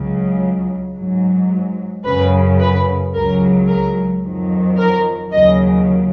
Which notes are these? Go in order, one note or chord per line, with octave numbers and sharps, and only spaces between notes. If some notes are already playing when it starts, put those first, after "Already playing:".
Already playing: C#2 C#3 F#3
G#2 F#3
F#2 C#3 F#3 B4
B4
C#2 C#3 F#3 A#4
A#4
F2 D#3 F#3
A#4
D#2 C#3 F#3 D#5